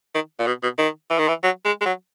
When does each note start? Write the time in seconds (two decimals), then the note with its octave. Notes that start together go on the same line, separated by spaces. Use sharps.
0.15 D#3
0.39 A#2
0.47 B2
0.63 B2
0.78 D#3
1.11 E3
1.19 D#3
1.28 E3
1.43 F#3
1.65 G#3
1.81 G#3
1.86 F#3